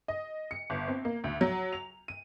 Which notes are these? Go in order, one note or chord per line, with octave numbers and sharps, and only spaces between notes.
D#5
C#7
G1
C4
A#3
D2
F#3
F7
D#7